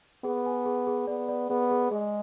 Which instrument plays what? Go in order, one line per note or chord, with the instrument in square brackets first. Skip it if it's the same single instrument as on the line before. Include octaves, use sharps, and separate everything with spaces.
[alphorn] B3 [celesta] G#4
[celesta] G#5
G#4
G#4
[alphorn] B3 [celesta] D5
[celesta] D5
[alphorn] B3 [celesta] G#4
[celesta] G#4
[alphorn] G#3 [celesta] G#4